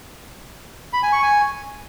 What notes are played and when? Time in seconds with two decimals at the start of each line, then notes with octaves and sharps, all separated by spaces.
0.93 B5
1.03 G#5
1.12 C#6
1.22 G#5